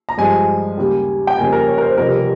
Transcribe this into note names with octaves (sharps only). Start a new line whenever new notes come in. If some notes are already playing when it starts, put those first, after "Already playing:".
A#5
G2 F3 G#3 G#5
D#2 C#3 G3
G5
F2 C#3 G3 A#3 G#5
A#4
C#5
A#4
C5
F1 F2 C#3 G3 A#4